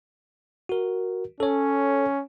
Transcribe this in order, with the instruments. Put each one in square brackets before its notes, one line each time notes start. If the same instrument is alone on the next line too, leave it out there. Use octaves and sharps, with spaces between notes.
[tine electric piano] F#4 A#4
[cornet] C#4 [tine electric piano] A4 C#5